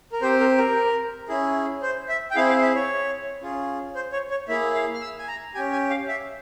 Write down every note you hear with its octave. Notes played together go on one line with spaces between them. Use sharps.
A#4
C4 G4 C5
A#4
A#4
C#4 E4 G#4
C5
E5
G5
C4 E4 G#4 F5
F5
E5
C#5
C#4 F4 G#4
C5
C#5
C#5
A#3 E4 G#4 E5
F5
F6
E6
G#5
A#5
C#4 G4 G#5
G#5
F5
E5